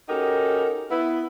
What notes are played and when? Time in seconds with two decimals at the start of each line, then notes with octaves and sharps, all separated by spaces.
0.09 C#4 D#4 F#4 G4 A4 A#4
0.90 B3 E4 B4